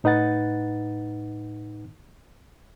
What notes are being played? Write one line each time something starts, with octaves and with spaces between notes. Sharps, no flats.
A2 D#4 B4 F#5 A6